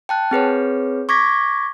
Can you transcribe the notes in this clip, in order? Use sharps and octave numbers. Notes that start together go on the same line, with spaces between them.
G5 A5 F#6
C4 G#4 B4 C#5
C#6 D6 G#6 A#6 B6